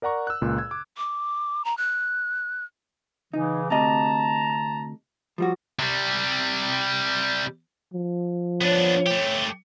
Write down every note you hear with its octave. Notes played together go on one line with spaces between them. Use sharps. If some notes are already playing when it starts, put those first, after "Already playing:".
A#4 D5 F#5 A#5 C#6
E6 F#6
C#2 A#2
G#6
D6
D6
A#5
F#6
C#3 E3 D#4
D2 C3 D#5 A5 A#5
F3 G3 F#4
C3 G3
F3
B3 D4 C#5
A3 G4